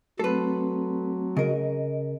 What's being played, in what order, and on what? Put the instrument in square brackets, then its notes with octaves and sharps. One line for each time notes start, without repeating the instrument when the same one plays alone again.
[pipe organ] F#3 [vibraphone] A3 C4 [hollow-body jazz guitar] A4 B4
[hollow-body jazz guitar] C#3 A#4 [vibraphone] D#5